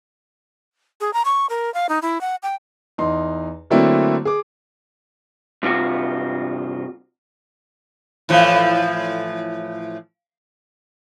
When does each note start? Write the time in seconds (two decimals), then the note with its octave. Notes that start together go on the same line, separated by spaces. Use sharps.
1.00 G#4
1.13 A#5
1.25 C#6
1.50 A#4
1.74 F5
1.89 D#4
2.02 E4
2.21 F#5
2.43 G5
2.98 E2 D#4 C6
3.70 D3 F#3 A3 A#3 C4 E4
4.25 G#4 D6
5.63 G2 C3 F4 F#4
8.29 A2 E3 F3